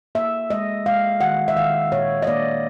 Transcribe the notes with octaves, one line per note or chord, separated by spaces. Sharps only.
A#3 E5
G#3 D#5
G#3 F5
D#3 F#5
E5
D#3 F5
A#2 C#5
D#5
A#3 D5